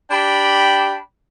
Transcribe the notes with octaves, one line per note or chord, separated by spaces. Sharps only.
D4 G4 G5 B5